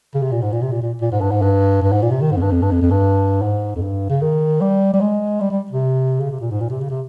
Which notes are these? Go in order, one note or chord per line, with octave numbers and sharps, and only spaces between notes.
C#3
C3
A#2
G#2
A#2
C3
A#2
A#2
A#2
G#2
G2
G#2
G2
G2
G#2
A#2
C3
D#3
G#2
F2
G2
F2
G2
F2
F2
G2
G#2
F2
G2
C#3
D#3
G3
G3
G#3
G3
G3
C3
C#3
C3
A#2
G#2
A#2
C3
C#3
C3